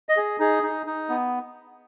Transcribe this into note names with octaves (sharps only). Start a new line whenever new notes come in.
D#5
G#4
D#4 G#4
D#4
D#4
B3